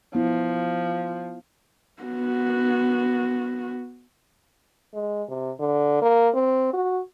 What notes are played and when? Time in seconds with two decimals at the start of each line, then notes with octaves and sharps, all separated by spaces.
0.15 F3 B3 E4
2.02 B3 F#4
4.94 G#3
5.29 C3
5.60 D3
6.02 A#3
6.34 C4
6.73 F#4